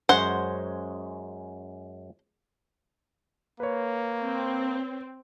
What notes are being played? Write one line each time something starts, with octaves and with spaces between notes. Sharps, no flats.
F#2 G#3 C5 C#5 F#5
A#3 B4 C#5
C4